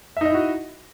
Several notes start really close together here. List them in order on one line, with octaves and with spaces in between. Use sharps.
E5 D#4 D#5 E4 F#4